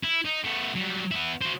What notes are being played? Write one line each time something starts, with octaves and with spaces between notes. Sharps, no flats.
E4
D#4
A3 B3
F#3 G3
B3 E4
F#4 C5